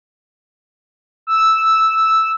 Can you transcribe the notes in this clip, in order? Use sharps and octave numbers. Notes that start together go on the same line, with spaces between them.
E6